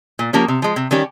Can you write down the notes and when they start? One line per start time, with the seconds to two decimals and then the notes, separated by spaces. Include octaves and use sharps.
0.19 A#2
0.33 F3 A#3 C#4 G4
0.48 C3
0.62 F3 G#3
0.76 C3
0.91 D#3 G3 C#4 G4